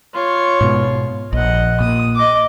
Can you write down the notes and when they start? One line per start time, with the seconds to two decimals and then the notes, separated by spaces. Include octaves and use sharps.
0.14 F4 C#5
0.61 G#2 B2
1.33 A#1 D#5 F#5
1.80 A#2 D#6
2.15 D#5 D6